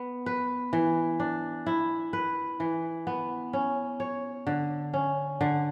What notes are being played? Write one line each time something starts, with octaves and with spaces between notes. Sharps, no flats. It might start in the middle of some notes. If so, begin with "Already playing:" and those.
Already playing: B3
B4
E3
D4
E4
B4
E3
B3
C#4
C#5
D3
C#4
D3